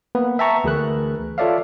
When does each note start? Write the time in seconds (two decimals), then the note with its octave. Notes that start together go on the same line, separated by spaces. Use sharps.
0.15 A#3 B3 B4
0.39 E5 G5 A5 A#5 C#6
0.64 D2 E3 G#4 A#4 B4 F#6
1.38 F4 A4 C#5 D5 E5 F5